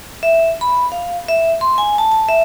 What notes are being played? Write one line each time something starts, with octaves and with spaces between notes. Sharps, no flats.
E5
B5
F5
E5
C6
G#5
A5
A5
E5